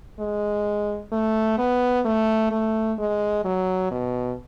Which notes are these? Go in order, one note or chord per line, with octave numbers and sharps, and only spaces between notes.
G#3
A3
B3
A3
A3
G#3
F#3
B2